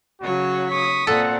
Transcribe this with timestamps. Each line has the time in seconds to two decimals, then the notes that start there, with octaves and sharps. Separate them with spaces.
0.21 C#3 F#3 F#4 C#5
0.71 C#6 D#6 B6
1.07 A#2 C4 A4 F#5